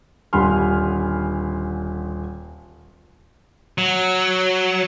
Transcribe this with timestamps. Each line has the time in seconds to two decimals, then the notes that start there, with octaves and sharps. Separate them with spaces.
0.33 D#1 D3 G#5 B5 C6 F6
3.78 F#3